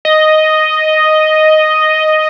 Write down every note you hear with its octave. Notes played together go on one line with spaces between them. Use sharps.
D#5